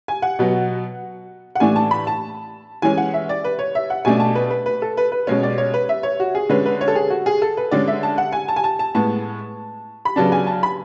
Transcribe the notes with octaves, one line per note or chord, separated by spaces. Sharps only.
G#5
F#5
B2 F#3 B3
F#5
A2 E3 A3 D4 G#5
A5
B5
A5
E3 G#3 C#4 G#5
F#5
E5
D5
B4
C#5
E5
F#5
B2 A3 D4 G#5
A5
B4
B4
B4
A4
B4
B4
B2 G#3 C#4 C#5
D5
C#5
B4
E5
C#5
F#4
G#4
D3 G#3 C#4 B4
B4
C#5
A4
G#4
F#4
G#4
A4
B4
D3 G#3 C#4 D5
E5
A5
F#5
G#5
A5
G#5
A5
A5
A2 G#3 B3 A5
B5
C#3 F#3 B3 D4 A5
G#5
A5
B5